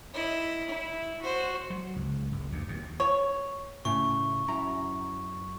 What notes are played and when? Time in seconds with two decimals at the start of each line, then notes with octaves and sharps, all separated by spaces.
0.14 E4 D#5
0.69 E4
1.21 F#4 C5
1.70 F#3
1.96 C#2
2.32 F#1
2.51 D2
2.68 D#2
3.00 C#5
3.85 A2 C#3 C#6
4.48 F#2 E4 A#5